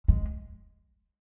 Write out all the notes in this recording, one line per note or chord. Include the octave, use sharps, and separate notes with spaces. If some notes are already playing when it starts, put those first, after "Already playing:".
G#3